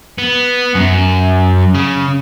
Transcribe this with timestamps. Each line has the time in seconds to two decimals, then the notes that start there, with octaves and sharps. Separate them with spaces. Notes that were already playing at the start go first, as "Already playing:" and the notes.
0.18 B3
0.75 F#2
1.75 C#3